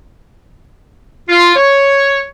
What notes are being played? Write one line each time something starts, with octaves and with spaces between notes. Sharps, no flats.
F4
C#5